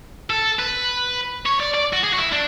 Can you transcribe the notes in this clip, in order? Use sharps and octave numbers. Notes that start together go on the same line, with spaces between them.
A4
B4
C#5
D5
D5
F#4
G#4
F#4
E4
D4